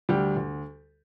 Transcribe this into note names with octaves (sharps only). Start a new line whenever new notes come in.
D2 G3 G4
D2